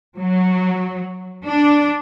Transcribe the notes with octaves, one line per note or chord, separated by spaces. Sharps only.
F#3
D4